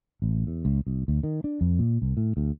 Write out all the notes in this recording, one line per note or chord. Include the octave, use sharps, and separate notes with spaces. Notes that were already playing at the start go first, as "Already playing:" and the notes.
A1
E2
C#2
C2
D2
D#3
D4
F2
A#2
C2
A2
D2